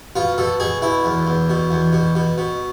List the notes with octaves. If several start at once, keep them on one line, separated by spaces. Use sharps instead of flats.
B2 F4
B2 A4
B2 G#4
B2 E4
E2
E2
B2
E2
B2
B2
B2